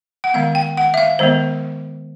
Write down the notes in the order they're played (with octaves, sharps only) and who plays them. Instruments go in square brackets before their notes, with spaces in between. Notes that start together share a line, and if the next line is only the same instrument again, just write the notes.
[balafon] F#5
D#3 G#3 B3 F5
G5
F#5
E5
F5
D#3 G#3 B3 C5